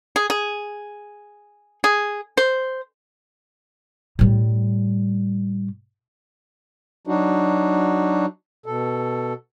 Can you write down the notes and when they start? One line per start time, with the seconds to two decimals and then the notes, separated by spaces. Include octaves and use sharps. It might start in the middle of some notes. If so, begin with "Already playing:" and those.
0.16 G#4
0.30 G#4
1.84 G#4
2.37 C5
4.19 A2 G3
7.07 F#3 D4 D#4 F#4
8.66 B2 A4